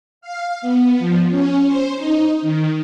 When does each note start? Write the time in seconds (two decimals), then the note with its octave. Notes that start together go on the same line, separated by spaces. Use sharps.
0.21 F5
0.62 B3
0.99 F3
1.30 C#4
1.66 C5
1.96 D#4
2.42 D#3